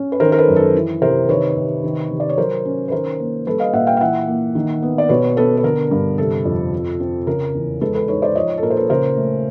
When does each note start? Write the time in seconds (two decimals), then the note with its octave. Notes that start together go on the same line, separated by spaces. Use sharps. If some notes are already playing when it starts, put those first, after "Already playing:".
Already playing: C#4
0.12 B4
0.20 D#3 A#4 C5
0.32 A#4
0.38 A4 B4
0.48 F#2
0.56 A4
0.75 E3
1.02 C3 A#4 C5
1.29 D#3 B4 C#5
1.57 C3
1.84 D#3
2.10 C3
2.20 D5
2.29 C#5
2.38 F#3 A#4 C5
2.65 C#4
2.88 B4
2.92 D#3 A#4 C5
3.19 A#3
3.47 G3 A4 B4
3.60 D#5 F5
3.73 A#2 E5 F#5
3.87 F5 G5
3.97 F5
4.00 E3 E5 F#5
4.28 A#3
4.55 D#3
4.82 B3
4.98 D5
5.09 B2 B4 C#5
5.37 B3 A4 B4
5.57 B4
5.63 D3 A#4
5.91 G2
6.18 C3 A4
6.45 F2
6.72 F3
7.00 C4
7.27 C#3 A#4
7.54 E2
7.81 G#3 A4 B4
7.95 A4 B4
8.08 D#4 B4 C#5
8.22 C5 D5
8.35 F3 C#5 D#5
8.58 A4
8.63 A#2 A#4
8.70 C5
8.77 A4 B4
8.90 C#3 A#4 C5
9.17 A3